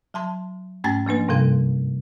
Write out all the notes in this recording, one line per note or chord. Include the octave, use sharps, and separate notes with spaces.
F#3 A5 C6
G#2 A3 C#4 A#5 A6
F3 A#3 D4 B4
G2 C3 G3 A4 F5